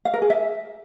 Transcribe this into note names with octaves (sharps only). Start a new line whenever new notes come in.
F5
A#4
G#4
E5